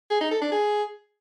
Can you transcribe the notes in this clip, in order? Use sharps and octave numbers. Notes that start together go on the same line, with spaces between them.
G#4
D#4
A4
D4
G#4